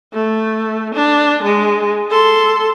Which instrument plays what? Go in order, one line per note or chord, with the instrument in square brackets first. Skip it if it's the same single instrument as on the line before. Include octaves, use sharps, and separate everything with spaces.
[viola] A3
D4
G#3
A4 C6